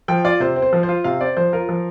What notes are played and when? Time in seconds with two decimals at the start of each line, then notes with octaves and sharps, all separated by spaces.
0.08 F3 G5
0.24 F4 D5
0.40 C3 C5
0.56 C4
0.62 C5
0.73 F3
0.83 C5
0.89 F4
1.04 C3 F5
1.21 C4 D5
1.37 F3 C5
1.53 F4 A#4
1.69 F3